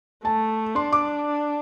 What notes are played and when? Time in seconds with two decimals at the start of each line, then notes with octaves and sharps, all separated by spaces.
0.24 A3 A5
0.75 D4 C6
0.92 D6